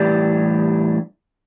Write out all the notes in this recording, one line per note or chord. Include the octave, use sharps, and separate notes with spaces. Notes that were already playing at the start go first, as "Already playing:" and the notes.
Already playing: A2 E3 G3 D4 G4